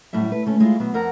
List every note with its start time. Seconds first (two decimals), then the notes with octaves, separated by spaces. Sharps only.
0.13 F#2 A2 F#3 G3 E5
0.32 B4
0.46 D2 A3 C#4
0.60 G#3 E4 F4
0.80 B2 F#3 B3
0.94 F2 A#4 F#5 A#5